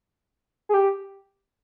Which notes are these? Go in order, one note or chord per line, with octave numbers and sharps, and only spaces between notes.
G#4
G4